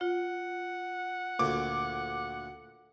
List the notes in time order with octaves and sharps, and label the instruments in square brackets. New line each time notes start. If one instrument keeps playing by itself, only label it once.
[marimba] F4 [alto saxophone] F#5
[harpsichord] D2 A#2 [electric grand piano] D6